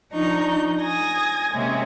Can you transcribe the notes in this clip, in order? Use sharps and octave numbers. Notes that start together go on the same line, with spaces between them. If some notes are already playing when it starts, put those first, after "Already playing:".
F3 D4 D#4 A#5 C#6 G6
G#5 D#6 G#6 A#6
C3 G#3 A#3 C#4 E5